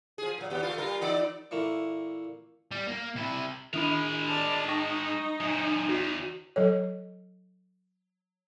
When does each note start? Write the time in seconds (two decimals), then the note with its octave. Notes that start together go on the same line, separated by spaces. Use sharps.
0.18 F3 G#4
0.38 A#2 F#3
0.50 D#2 B3 G4
0.63 A3 F4
0.78 G3 F4 A#4
1.01 E3 D#4 D5
1.51 A#2 E3 A3 A#3
2.71 G3
2.88 A#3
3.16 C3 E4
3.74 D#3 G#3 D4 A#4 B5
4.28 D5 A5
4.68 D#4 G5 C#6 A#6
5.40 F#2 A#2
5.89 E2 F#4
6.56 F#3 A4 C#5